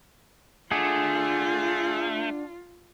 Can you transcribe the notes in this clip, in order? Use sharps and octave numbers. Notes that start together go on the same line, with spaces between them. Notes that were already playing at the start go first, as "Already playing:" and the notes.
A3 D4 F4 G#4 F#5